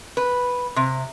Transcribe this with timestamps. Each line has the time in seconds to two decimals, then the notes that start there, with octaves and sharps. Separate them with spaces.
0.17 B4
0.76 C3